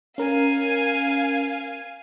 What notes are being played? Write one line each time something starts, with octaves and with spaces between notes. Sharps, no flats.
C#4 A#4 F5 G#5